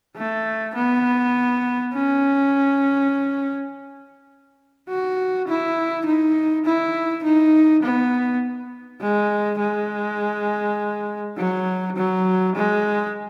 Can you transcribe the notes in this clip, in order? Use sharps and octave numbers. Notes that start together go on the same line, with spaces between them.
A3
B3
C#4
F#4
E4
D#4
E4
D#4
B3
G#3
G#3
F#3
F#3
G#3